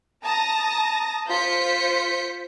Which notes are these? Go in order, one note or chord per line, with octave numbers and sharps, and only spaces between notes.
A5 A#5 D#6 A#6
F4 C5 G6 B6 C#7